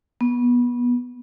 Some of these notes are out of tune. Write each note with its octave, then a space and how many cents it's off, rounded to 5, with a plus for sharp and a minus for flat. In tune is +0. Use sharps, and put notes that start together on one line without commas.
B3 -20